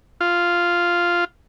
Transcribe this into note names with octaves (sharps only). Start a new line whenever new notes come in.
F4